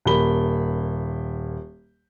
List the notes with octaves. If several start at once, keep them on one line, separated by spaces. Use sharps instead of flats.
D#1 A#3 B5 G7